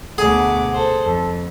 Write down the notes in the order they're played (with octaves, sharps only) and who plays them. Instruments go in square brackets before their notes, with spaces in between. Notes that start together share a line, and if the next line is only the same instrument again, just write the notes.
[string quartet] D2 B2 D6 [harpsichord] G#4 [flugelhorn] F#5
[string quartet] A4 C5
[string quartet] F2 [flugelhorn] A4